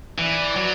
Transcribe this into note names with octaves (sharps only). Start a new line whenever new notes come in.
E3 D5
F#3